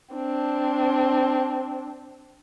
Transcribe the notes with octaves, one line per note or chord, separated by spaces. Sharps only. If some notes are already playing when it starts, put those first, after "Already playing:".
C4 D4